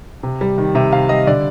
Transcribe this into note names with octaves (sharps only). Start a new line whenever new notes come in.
C3
G3
D#3
C3 E5
C3 F5
G3 D#5
D3 D5